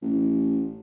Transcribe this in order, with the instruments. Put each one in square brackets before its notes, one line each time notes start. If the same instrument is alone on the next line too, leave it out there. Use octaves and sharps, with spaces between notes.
[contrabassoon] A1